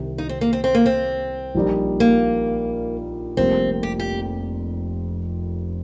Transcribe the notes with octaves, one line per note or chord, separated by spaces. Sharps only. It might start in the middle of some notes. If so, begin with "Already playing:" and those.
Already playing: C2 C3 D#3
D#4
C4
A#3
C4
C4
A#3
C4
A#1 A#2 G3 D#4
A#3
F1 F2 C3 G3 A#3 C4
G4
G4